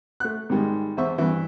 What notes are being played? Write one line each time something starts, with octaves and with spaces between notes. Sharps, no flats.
A3 F#6
G#2 D#3 G3 G#3
E2 C5 E5 C#6
G2 E3